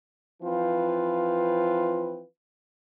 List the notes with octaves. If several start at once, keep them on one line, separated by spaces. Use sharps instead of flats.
E3 F3 C4 F4 B4